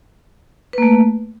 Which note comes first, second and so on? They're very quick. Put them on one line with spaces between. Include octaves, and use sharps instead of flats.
B4 A#3 A3